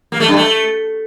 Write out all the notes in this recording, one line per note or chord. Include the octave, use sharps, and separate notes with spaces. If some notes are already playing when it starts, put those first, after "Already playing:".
A#3
A3
G2
A3